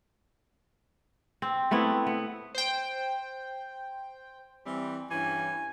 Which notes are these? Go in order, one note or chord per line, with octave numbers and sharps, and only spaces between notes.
C4
A3 B3 C4 E4
B3
C5 G5
E3 G3 C4
G2 E3 C#4 G#5